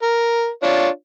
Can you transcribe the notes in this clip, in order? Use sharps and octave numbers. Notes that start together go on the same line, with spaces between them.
A#4
D4 F4 C#5